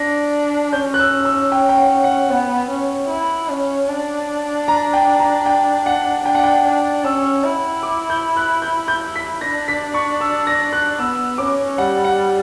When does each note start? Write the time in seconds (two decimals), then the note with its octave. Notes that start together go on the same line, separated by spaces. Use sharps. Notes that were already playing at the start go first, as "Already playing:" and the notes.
Already playing: D4 A#6
0.73 C#4 G6
0.94 F#6
1.00 E6
1.25 E6
1.52 G5
1.69 G5
1.78 F#5
2.04 F#5
2.30 B3 F#5
2.70 C#4
3.09 E4
3.49 C#4
3.89 D4
4.68 A#5
4.93 G5
5.20 A#5
5.46 G5
5.86 F#5
6.25 D4 G5
6.35 F#5
6.44 G5
6.65 D4
7.04 C#4 E6
7.44 E4
7.83 D6
8.10 G6
8.37 F#6
8.62 G6
8.88 G6
9.16 B6
9.41 D4 A#6
9.68 B6
9.94 C#6
10.21 E6
10.47 A#6
10.73 F#6
10.99 B3 E6
11.38 C#4 D6
11.78 G3 F#5
12.04 F#5